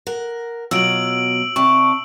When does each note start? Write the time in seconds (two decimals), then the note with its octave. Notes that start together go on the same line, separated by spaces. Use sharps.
0.07 A#4 F#5
0.71 B2 F#3 F4 E6 D7 F#7
1.56 C3 D5 A5 C#6